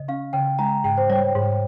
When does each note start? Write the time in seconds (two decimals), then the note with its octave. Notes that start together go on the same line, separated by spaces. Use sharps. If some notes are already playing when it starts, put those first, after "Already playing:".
Already playing: C#3 D#5
0.08 C#4 F5
0.33 C#3 G5
0.59 G#3 A#5
0.84 G#2 G5
0.97 C5
1.10 G3 C#5
1.35 G#2